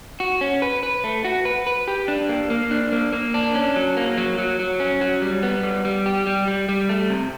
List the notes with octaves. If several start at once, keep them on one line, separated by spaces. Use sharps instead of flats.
F#4
C#4
B4
B4
A3
F#4
B4
B4
G4
D4
A#3
A#3
D4
A#3
A#3
D4
C#4
F#3
A#3
F#3
F#3
F#3
C#4
F#3
G3
B3
G3
G3
G4
G3
G3
G3
A3
C3